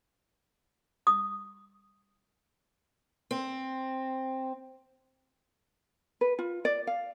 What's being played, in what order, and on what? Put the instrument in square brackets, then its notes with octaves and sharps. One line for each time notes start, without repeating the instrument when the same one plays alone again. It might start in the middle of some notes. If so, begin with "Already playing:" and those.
[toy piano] D#6
[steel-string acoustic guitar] C4
[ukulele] B4
F4
D5
F5